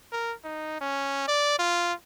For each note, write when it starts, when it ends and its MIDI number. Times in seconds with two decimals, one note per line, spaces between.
0.12 0.34 70
0.44 0.81 63
0.81 1.27 61
1.28 1.56 74
1.59 1.93 65